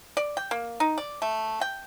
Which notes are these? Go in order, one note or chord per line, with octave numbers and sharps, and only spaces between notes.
D5
G5
A#3
D#4
D5
A3
G5